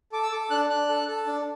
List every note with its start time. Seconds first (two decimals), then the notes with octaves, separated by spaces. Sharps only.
0.12 A4 D6
0.23 E6
0.32 A4 D6
0.50 D4 F#6
0.70 D4 F#6
0.89 A4
1.08 A4
1.27 D4